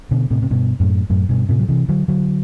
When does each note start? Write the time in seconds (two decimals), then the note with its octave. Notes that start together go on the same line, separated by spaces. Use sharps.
0.11 B2 D3
0.30 A2 C3
0.42 C3
0.51 G2 B2
0.80 F#2 A2
1.10 F#2 A2
1.29 G2 B2
1.49 A2 C3
1.59 F#3
1.69 C3 E3
1.88 D3 F#3
2.08 D3 F#3